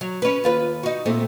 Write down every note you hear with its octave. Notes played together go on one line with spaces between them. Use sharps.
F#3
C#4 B4
D#2 F4 B4
D#4 F#4
A#2 A3 C4